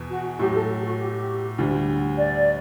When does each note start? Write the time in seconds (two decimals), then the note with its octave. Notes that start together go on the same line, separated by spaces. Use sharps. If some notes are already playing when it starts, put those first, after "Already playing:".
Already playing: E2 B2
0.09 F#4
0.39 A2 F#3 A3 G4
0.54 A4
0.78 G4
0.84 F#4
0.98 G4
1.58 D2 D3 G3
2.17 D5